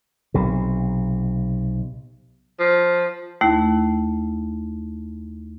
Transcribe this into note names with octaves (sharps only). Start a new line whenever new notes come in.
B1 C3
F3
D#2 A3 E4